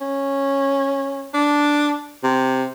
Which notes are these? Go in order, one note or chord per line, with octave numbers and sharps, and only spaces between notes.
C#4
D4
C3